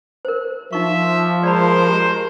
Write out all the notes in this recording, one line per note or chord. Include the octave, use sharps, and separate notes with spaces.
A#4 C5
F3 D#4 E5 C#6
G#3 A#4 C5 D5 A5 B5
G4